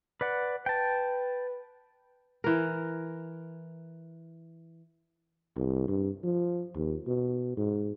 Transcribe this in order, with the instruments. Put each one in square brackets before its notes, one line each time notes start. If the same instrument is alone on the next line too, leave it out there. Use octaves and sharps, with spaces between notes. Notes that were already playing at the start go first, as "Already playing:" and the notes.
[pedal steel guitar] B4 D5 F#5
[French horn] B4 [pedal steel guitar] G5 A5
[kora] E3 A#4
[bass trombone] C2
G2
F3
D#2
B2
G#2